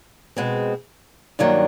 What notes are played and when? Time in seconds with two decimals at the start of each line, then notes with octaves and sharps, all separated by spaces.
0.36 B2 G#3 C4
1.39 G2 D#3 F#3 A#3 D4